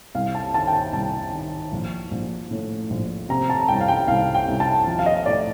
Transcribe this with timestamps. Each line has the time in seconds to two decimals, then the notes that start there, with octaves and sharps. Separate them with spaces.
0.15 C2 F5
0.35 A5
0.54 D#3 A5
0.67 G5
0.73 A5
0.93 C2 A5
1.32 D#3
1.72 A#1
2.11 A#1
2.51 A2
2.90 A#1
3.29 C3 A#5
3.50 A5
3.68 C2 G5
3.81 F5
3.88 G5
4.08 C2 F5
4.35 G5
4.48 C2
4.60 A5
4.87 F3
4.99 F5
5.06 D#5
5.26 A2 D5